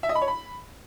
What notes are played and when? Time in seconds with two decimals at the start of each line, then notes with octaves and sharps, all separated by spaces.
0.03 E5
0.09 D#5
0.15 B5
0.22 C#5
0.28 B5